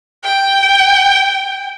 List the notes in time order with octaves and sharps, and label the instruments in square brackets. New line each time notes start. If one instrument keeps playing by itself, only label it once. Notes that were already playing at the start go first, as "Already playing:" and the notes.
[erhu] G5